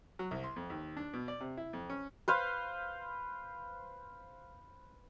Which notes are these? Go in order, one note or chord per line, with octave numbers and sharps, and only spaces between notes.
F#3
C2
C6
F2
D#2
D4
B2
D5
C3
E4
F2
C#4
B4 C5 F5